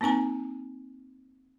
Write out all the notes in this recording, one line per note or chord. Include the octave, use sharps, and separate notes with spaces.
A#3 C4 D#4 G#5 A#5